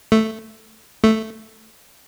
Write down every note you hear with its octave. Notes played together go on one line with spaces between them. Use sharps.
A3
A3